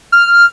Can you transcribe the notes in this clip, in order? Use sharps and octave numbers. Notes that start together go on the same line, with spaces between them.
F6